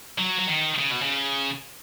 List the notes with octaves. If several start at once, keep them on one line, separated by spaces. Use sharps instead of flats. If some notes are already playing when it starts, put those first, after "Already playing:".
F#3
F#3
D#3
C#3
B2
C#3